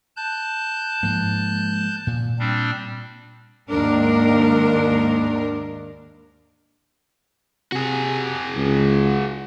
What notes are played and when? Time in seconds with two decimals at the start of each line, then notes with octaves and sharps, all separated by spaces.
0.17 A5 F#6 G6
1.03 G#2 F3 A#3
2.07 A#2
2.39 G3 C4 D4
3.70 D#2 G#2 D4 A#4
7.72 C3 F#4 G#4
8.55 C#2